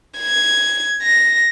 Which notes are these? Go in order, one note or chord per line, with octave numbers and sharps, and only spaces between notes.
G#6
A#6